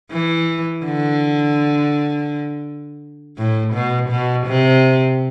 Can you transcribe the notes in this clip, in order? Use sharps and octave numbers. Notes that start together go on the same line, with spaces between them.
E3
D3
A2
B2
B2
C3